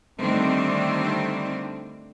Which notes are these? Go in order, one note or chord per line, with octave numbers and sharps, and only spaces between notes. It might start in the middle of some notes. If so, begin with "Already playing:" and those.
D3 D#3 G3 A3 C4 D4